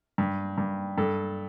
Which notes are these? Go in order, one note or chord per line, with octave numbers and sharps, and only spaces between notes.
G2
G2
G2 A4